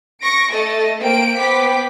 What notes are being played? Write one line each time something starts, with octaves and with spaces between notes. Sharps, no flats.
C#6 A#6 D7
A3 D#5 A6
A#3 C5 G5 D7
B3 C5 G5 D6 B6